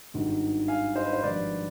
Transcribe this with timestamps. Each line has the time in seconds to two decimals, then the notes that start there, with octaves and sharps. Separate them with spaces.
0.14 G#1 G2 D#3
0.68 F5 G#5
0.96 C5 D#5
1.05 B4
1.13 C5
1.23 G#1 G2 F3 B4 D5